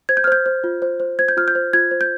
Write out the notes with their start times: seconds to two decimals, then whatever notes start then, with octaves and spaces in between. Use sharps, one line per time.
0.09 C5 G#6
0.17 G6
0.24 F6
0.27 C5 G6
0.46 C5
0.64 F4
0.82 C5
1.00 C5
1.19 C5 G#6
1.28 G6
1.37 F4 F6
1.48 G6
1.55 C5
1.73 F4 G#6
1.91 C5
2.01 G6